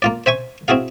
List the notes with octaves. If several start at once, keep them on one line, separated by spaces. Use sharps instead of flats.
A#3 F4 D5
C5 E5 G#5 C#6
C4 E4 F#4 G#4 F5